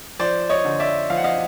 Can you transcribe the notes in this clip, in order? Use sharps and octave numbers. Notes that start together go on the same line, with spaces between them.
F3 C5 D5
C#5 D#5
D3
D5 E5
F3 F5
F#5
D#5 F5